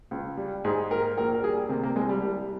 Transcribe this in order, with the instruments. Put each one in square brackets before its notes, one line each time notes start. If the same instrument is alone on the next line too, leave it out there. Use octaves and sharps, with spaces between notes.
[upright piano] C#2
G3
[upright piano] G#2 [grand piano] G#4
[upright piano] A#3 [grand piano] A#4
[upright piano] A#1 [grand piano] A#4
[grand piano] A#4
[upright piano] G3 [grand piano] G#4
[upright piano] C3 [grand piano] A#3
[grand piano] A#3
[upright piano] C2 [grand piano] G#3
[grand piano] G3
[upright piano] C2 [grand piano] G3